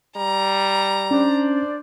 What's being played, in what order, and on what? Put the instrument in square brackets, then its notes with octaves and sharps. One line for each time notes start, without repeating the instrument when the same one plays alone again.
[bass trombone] G3 [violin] A#5
[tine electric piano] C#4 [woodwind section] D4 C5 D5